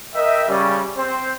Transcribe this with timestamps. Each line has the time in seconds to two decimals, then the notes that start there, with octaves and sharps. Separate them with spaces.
0.15 A#4 D#5 E5 G5
0.48 C#3 G3 C#4
0.97 C4 C5